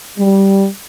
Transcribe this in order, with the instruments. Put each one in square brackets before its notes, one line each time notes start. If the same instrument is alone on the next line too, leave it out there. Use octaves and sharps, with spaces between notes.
[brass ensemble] G3